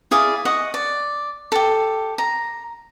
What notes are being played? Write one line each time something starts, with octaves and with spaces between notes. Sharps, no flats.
E4 G#4 D5 F5
D#5 F#5 C#6
D5
G4 A4
A#5